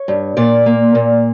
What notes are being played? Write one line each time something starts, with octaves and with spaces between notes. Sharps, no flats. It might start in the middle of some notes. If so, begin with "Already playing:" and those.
Already playing: C#5
G2
A#2 D5
A#3
A#2